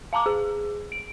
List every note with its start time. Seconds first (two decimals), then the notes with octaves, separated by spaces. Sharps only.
0.13 F5 A5 A#5 D6
0.26 G#4
0.92 D7